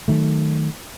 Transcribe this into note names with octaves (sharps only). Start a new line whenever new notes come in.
D#3 F#3 A3